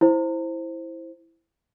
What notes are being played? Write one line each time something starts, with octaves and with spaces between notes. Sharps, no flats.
E4 C5